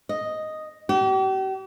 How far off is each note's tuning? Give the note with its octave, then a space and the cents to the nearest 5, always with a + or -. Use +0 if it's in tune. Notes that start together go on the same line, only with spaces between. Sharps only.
D#5 +0
G4 -40